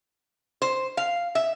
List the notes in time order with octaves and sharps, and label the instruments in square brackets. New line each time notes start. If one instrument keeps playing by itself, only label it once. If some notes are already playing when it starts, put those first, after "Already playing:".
[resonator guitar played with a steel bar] C5
F5
E5